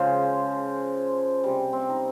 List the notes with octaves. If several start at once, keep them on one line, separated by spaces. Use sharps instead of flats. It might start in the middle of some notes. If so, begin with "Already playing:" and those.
Already playing: C#3 F3 G#3 C5
C3 G3
C4
D#4